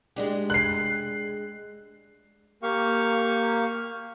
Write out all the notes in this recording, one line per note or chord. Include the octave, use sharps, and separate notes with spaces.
G#3 D4 G4
F#6 C7
A#3 G4 F5 C#6